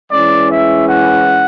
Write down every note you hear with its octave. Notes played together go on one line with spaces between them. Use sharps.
E3 G#3 C#4 E4 D5
E5
F#5